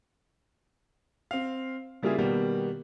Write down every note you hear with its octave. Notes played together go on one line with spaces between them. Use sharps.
C4 F5
C#3 G3 A#3 E4 F4 G#4
B2 D#3 G3 A#3 B3